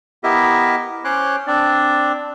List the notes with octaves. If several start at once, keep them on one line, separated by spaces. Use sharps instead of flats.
B3 E4 G4 A#4 D#5 E5
C#4 C5 C#5 C6 D6 F#6
C4 D4 D5